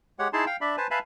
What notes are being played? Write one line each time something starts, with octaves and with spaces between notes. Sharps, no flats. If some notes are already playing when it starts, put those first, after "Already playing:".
G#3 G4 C#5 F#5
D#4 E4 G#4 A5 C6
F5 G5
D4 D5 E5 B5
B4 C5 G#5 A5
B4 E5 F5 G#5 A5 B5